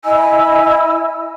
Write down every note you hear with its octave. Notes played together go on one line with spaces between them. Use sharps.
E4 D#5 G#5 E6